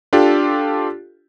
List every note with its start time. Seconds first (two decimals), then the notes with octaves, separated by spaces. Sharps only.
0.13 D4 F4 G4 A4